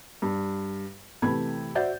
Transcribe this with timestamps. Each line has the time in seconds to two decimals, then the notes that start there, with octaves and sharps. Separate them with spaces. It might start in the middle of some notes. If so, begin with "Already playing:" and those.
0.22 G2
1.22 C3 E3 A3 B5 G#6
1.75 F#4 C5 D5 E5 G6 A6